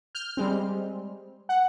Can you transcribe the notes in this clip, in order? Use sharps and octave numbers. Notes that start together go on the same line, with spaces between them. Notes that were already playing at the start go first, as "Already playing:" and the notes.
F6 G6
G3 G#3 C4
F#5